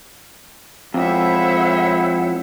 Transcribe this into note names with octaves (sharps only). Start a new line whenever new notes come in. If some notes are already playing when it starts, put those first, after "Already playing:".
F2 G#3 E4 C5 C#5 E5 F#5